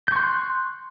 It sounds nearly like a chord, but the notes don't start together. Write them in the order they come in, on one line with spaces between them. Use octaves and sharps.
G6 C#6 C6 F#6